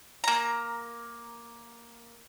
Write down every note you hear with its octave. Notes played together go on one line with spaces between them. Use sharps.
A#3 A#5